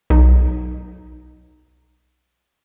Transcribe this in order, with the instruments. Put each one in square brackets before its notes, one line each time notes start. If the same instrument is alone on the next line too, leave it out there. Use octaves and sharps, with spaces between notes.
[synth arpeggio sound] B1 D#4